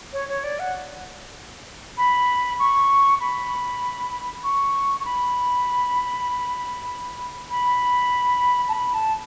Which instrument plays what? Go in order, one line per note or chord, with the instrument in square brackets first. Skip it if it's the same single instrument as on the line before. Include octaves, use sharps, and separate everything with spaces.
[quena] C#5
C#5
D5
F#5
B5
C#6
B5
C#6
C#6
B5
B5
A5
B5
A5